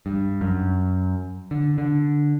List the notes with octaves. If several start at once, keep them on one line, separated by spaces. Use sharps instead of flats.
G2
F#2
D3
D3